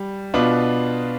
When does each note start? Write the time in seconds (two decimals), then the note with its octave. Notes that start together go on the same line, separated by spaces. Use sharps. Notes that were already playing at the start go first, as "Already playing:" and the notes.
Already playing: G3
0.34 B2 B3 D4 F4